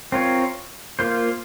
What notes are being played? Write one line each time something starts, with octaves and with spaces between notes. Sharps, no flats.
C4 F4 A#4 C#5
A#3 F4 C5